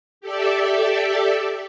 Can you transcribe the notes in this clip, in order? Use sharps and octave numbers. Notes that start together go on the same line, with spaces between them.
G4 A4 D5 E5